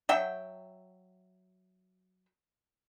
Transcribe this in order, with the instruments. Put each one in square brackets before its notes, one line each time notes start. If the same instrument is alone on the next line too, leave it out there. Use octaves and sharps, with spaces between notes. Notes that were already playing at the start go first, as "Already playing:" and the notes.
[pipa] F#3 E5 G5